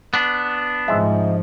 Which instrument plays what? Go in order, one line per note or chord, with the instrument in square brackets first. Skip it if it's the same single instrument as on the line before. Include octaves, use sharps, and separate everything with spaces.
[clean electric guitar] B3 D4
[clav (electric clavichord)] C2 G#3 E5 [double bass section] G#2 F3